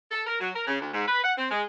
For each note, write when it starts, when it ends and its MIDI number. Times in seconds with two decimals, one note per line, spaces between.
0.11 0.24 69
0.27 0.37 70
0.40 0.49 54
0.55 0.66 70
0.67 0.81 49
0.81 0.89 38
0.93 1.05 44
1.07 1.21 71
1.23 1.32 78
1.37 1.50 60
1.51 1.63 56